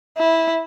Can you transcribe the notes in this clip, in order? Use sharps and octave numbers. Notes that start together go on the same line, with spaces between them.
E4